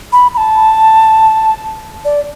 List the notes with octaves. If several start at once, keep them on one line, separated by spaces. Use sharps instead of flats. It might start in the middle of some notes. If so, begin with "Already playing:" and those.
B5
B5
A5
D5